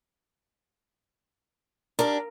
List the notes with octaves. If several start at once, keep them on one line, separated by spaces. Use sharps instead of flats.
D4 G4 A#4